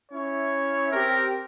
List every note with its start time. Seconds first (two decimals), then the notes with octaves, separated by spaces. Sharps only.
0.12 C#4 E4 C#5
0.92 C4 G4 A#4